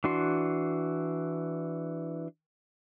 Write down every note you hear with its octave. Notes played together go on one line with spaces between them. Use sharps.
E3 D4 F#4 C6